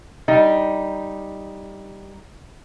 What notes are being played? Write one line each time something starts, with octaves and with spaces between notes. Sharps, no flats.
G3 D#4